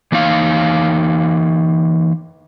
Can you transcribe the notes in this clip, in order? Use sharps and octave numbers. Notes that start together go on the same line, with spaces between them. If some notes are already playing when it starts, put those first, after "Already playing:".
E3 A#3 D#4 F5